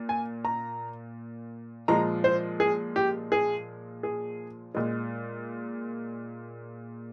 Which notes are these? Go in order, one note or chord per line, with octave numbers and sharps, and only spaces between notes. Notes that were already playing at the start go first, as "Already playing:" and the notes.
Already playing: A#2
G#5
A#5
A#2 F3 G#3 A#5
C5
G#4
G4
G#4
G#4
A#2 G#3